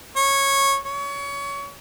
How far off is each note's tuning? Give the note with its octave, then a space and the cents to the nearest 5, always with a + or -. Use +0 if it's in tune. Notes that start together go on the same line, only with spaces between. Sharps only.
C#5 -10
C#5 +25